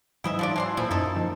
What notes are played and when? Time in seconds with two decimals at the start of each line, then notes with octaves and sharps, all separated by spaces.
0.24 G#2 E3 F#3 E4 D#5 E5
0.39 F3 D4 D5
0.56 E3 F5 A5 C6
0.77 A#2 C#3 F3 E4
0.91 F#2 D#4 A4
1.16 D#3 F3